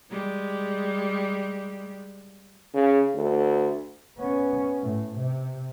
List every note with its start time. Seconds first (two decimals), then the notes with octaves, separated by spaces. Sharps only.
0.10 G3 G#3
2.74 C#3
3.15 D2
4.18 B3 C#4
4.82 A2
5.16 C3